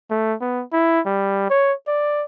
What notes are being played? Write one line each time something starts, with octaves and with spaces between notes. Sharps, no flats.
A3
B3
E4
G3
C#5
D5